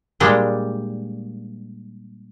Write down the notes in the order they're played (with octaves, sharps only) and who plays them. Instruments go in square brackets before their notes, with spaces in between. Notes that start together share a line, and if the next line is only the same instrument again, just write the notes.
[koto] A#2 G3 G#3 D4 D#5 G5